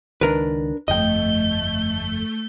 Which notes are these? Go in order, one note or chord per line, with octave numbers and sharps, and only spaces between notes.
C#2 D#3 D4 A#4 B4
G1 F2 A3 D#5 G5 G6